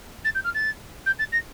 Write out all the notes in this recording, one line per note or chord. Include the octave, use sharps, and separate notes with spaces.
A6
G6
F6
A6
G6
A6
A#6